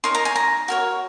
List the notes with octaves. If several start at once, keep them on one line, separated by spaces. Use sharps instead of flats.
D#4 A#4 C#5 C6
A#5
G#5
A#5
F#4 A#4 C#5